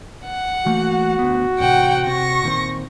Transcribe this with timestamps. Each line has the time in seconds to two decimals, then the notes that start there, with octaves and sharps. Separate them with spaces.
0.24 F#5
0.66 E3 A3 A#3 F#4
1.19 D2 B3
1.59 A1 A2 C3 F#5 G5
2.07 C3 C#6 A#6
2.43 A#2 D#3 C4